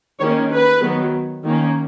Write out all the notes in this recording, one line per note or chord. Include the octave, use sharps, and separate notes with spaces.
D#3 A#3 C#4 C#5
B4
D#3 F#3 B3
D#3 A#3 C#4